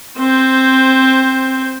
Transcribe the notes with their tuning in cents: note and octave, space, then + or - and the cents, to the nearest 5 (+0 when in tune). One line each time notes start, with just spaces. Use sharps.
C4 +10 C5 +0